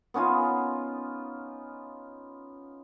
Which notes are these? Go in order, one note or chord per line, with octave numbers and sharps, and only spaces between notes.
B3 C#4 D#4 F4